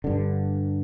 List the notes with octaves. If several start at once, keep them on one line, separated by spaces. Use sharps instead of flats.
G2 D3